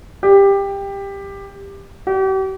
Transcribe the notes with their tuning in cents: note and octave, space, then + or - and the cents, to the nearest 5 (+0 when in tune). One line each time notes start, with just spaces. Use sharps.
G4 +15
G4 -40